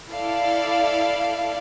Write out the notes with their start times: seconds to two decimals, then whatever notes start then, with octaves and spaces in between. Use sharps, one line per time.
0.11 E4 A4 D5 F5